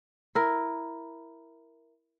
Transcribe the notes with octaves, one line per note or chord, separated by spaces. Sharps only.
E4 A#4